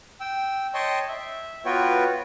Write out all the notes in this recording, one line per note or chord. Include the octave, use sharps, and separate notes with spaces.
G5 E6
C#5 D#5 G5 A5 C6 C#6
E5
B3 F4 F#4 B4 C#5 G5